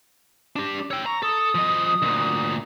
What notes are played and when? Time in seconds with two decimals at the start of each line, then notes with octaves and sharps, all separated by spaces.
0.56 D4 G4
0.91 C#5 G5 E6
1.06 A#5 C#6
1.23 A4 D#6
1.55 F3 D#5
2.02 D2 A#2